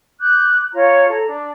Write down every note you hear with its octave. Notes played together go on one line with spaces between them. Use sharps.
D6 F#6 G6
F4 C#5 A#5
A4 A#5
D4